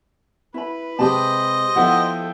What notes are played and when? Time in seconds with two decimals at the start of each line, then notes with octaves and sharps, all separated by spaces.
0.54 E4 B4 B5
0.99 C3 G#3 G4 C5 D#5 A5
1.76 F3 B3 E4 A4 F#5 G5